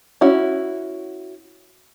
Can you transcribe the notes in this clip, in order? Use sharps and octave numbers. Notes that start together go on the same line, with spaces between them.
C#4 E4 F#4